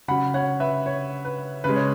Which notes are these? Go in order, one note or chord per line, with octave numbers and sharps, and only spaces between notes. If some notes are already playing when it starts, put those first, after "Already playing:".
C#3 F#3 F#5 B5
C#5 F#5
B4 E5
C#5
B4
C#3 G#3 B4
C#5